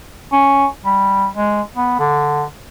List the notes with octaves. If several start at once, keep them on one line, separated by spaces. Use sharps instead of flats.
C#4
G3
G#3
B3
D3